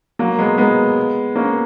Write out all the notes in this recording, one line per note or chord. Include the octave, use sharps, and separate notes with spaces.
F#3 A#3
G#3 B3
G#3 B3
A#3 C#4